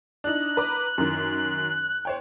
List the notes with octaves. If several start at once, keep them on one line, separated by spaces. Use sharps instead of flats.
D4 D#4 F#6
B4 A#5 D6
F#2 D#3
C5 C#5 G5